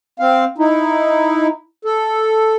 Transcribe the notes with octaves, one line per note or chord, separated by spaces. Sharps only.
C4 F5
D#4 E4
A4